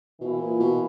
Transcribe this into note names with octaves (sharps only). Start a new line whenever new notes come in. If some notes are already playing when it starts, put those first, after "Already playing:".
B2 E3 A#3 E4
A#2
B2